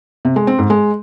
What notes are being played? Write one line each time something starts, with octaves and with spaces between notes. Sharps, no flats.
C3
G#3
C4
G#2
G#3